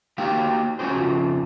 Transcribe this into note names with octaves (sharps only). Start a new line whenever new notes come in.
A#3 D#4 F#4 G4 A#4 F5
F#3 C#4 F#4 G#4 C5
F2 G#2 C#3 F3